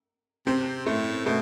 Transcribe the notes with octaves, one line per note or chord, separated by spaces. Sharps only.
C3 C4
A2 A3
B2 A3